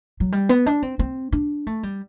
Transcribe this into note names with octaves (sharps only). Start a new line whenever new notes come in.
F#3
G3
B3
D4
C4
C4
D4
A3
G3